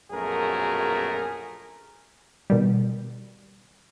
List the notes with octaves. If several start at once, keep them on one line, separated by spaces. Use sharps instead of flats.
A#1 F#2 B2 A3 G#4 A#4
B2 D#3 G3